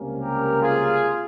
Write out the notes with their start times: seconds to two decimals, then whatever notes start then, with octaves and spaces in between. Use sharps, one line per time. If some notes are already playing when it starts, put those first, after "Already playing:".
Already playing: C#2 C3 G3 A#3 C#4
0.19 G4 A#4
0.62 F4 G#4